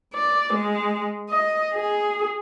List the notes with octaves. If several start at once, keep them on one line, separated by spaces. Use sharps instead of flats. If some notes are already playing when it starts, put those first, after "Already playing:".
D5
G#3
D#5
G#4